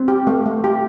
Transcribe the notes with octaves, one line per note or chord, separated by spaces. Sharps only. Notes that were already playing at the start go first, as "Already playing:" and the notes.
Already playing: C4
G4
A3
A3
G4